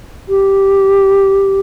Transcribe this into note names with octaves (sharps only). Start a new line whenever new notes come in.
G4